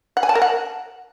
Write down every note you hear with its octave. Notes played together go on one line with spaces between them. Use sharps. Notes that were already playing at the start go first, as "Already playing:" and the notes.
F#5
G#5
A5
A#4
F#5